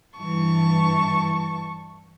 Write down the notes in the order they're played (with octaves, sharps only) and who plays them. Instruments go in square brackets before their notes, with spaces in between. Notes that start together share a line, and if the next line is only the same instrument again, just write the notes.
[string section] G2 E3 [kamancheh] A5 C#6